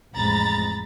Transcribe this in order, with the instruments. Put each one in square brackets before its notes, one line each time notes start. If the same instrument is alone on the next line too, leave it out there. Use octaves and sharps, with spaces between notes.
[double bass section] A1 F2 G#3 [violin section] A#5 B5 A6